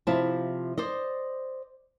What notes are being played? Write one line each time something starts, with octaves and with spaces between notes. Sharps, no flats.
C3 F3 E4 A5
C5 D5 D#5